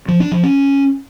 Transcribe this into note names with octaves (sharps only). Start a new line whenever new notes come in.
F3
D4
F3
C#4